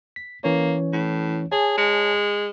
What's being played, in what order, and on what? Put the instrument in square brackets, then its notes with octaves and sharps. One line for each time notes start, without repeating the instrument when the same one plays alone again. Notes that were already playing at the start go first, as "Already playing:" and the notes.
[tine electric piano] B6
[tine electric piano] E3 C#4 C#5 [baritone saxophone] A#3
[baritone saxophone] A2
[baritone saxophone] G#4 [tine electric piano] C#5 G#5 A5
[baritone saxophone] G#3